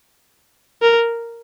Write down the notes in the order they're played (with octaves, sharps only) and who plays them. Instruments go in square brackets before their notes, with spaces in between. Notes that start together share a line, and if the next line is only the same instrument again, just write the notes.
[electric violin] A#4